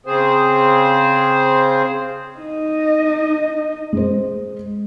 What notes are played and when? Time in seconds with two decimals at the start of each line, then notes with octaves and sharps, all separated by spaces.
0.06 C#3 C4 G#4 C5
2.39 D#4 D#5
3.93 G#3 C5